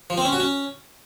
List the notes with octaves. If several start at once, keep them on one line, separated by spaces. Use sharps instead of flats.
F3
C4
C#4
F#4
C#4